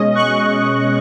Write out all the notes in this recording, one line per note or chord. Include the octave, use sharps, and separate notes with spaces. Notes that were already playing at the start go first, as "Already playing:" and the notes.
Already playing: B2 G#3 C#4 D#5
C#6 F#6